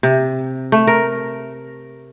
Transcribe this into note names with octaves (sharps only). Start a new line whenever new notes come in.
C3
A3
A#4